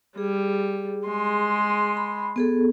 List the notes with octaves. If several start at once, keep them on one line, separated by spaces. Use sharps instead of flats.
G3 G#4
G#3 C6
B5
B3 G#4 A4